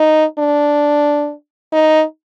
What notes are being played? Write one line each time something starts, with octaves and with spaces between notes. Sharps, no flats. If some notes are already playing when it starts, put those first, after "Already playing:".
Already playing: D#4
D4
D#4